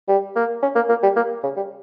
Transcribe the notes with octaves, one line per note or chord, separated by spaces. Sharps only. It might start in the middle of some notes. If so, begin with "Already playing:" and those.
G3
A#3
C#4
A#3
A#3
G3
A#3
C#3
G3